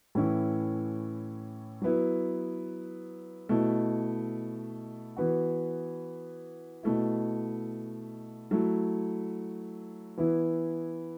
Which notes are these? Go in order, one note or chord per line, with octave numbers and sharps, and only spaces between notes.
A2 E3 C#4 E4
F#3 B3 E4
B2 A3 E4
E3 B3 F#4
B2 A3 E4
F#3 A3 E4
E3 B3 E4